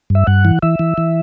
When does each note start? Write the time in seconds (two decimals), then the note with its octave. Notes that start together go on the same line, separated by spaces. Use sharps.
0.10 G2
0.15 E5
0.27 G2 F#5
0.45 E3
0.62 E3 E5
0.79 E3
0.98 E3